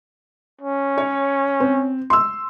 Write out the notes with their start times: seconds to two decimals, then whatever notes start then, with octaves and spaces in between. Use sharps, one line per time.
0.61 C#4
0.98 C#5
1.60 C4
2.10 C6 E6